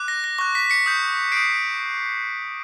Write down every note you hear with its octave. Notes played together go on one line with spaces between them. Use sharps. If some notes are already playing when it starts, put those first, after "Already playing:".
Already playing: D6 F#6
A#6
A#6
C#6 F#6 A#6
B6
B6 C#7
D#6 G6
D#6 G6 C7 D7